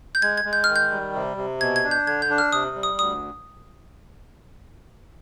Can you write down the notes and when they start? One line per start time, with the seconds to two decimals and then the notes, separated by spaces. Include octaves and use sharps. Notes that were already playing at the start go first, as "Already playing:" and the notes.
0.15 G6
0.22 G#3 G#6
0.38 G#6
0.45 G#3
0.53 G6
0.64 D#3 F6
0.76 G6
0.91 G3
1.14 C3
1.37 C3
1.61 B2 G#6
1.76 G#6
1.84 D4
1.91 G6
2.07 D3 G#6
2.22 G6
2.30 D4
2.38 F6
2.53 C3 D#6
2.76 G3
2.83 D#6
2.99 D2 D#6